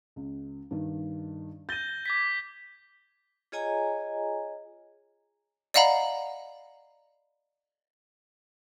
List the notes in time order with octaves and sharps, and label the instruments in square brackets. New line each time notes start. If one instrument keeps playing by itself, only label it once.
[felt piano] C#2
G2 D#3
[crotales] G6 A#6 G7 [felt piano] A6 D#7
[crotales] D6 G#6 B6
[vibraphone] F4 G#4 C#5 D#5 G#5 A#5
[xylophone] D5 D#5 F5 F#5 A#5 B5